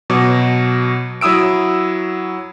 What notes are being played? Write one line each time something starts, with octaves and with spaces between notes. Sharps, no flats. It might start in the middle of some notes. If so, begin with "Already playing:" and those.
B2 F#3 D6
F#3 E4 D#6 E6 D7